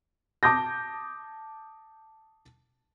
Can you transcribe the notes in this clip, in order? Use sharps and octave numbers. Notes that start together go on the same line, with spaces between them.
A5 D6 D#6 G6 A#6